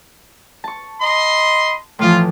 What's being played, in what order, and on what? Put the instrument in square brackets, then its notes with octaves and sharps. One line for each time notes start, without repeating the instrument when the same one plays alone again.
[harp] A5 C#6
[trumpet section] D#5 B5 C6
[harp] A2 E3 F3 [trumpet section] F4